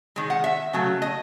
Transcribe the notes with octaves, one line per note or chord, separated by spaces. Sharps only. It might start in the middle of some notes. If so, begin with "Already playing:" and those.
D#3 G#3
F#5
E5
C#3 F#3 A3
D#5